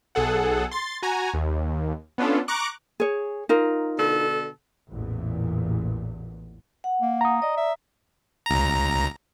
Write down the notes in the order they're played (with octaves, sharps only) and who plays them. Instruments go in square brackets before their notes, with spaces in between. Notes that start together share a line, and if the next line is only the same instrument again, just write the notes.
[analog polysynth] B1 G#4 A4 F#5
C6 A6
F#4 G#5 A#5
D#2
B3 C#4 D4 F4 A4
A#5 C#6 D6 F#6
[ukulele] G#4 C#5
D#4 F4 A#4
[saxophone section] B2 D3 A4
[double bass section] A1 E2 A#2
[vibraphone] F#5
[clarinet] A#3
[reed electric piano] A#5 D#6
[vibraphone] D5 [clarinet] D#5
[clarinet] E5
[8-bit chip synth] C#2 A#5